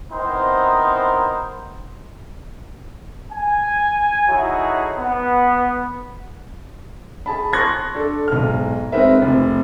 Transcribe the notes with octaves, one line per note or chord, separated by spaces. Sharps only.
B3 C4 D#4 E4 A#4 C5
G#5
F#3 D#4 E4 F#4 G#4 A4
B3
G#4 A5 B5
C6 C#6 F#6 G#6 A#6
D4 A4
B1 G#2 F6
G#3 C4 D#4 A#4 B4 E5
F1